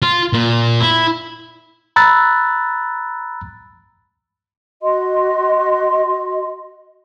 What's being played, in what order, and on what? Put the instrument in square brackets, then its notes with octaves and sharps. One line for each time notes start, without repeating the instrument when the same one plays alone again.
[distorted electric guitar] F4
A#2
E4
[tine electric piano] A#5 B5 E6 F#6 A6
[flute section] F#4 D#5 C6